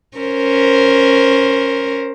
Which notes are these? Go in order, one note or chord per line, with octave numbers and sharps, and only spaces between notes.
C#4 A#4 C5